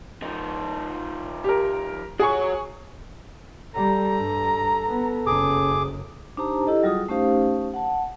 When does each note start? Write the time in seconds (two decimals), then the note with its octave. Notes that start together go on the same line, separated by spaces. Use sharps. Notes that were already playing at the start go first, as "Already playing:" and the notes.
0.22 F3 D#4
1.44 G4 A#4
2.19 F#4 G#4 C#5 C#6
3.75 G3 A4 A#5
4.17 G2
4.88 B3
5.26 F#1 F#2 G#4 D6
6.37 D4 D#4 G4 C5 A5 A#5
6.67 E4 G4 A4 D#5
6.83 F#3 G3 F4 F#4 G#4 D#6
7.08 A3 C#4 D#4 G4 C5 F5
7.74 F#5 A5